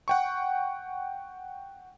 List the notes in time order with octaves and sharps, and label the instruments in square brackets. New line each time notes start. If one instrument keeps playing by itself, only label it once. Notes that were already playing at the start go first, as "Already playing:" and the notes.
[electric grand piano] F#5 G5 C#6